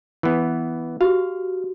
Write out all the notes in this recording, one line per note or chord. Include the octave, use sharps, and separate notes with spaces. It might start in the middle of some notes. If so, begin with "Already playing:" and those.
E3 B3
F#4 G4 F5